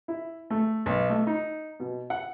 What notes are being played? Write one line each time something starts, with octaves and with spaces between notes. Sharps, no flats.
E4
A3
B1
A3
D#4
B2
F#5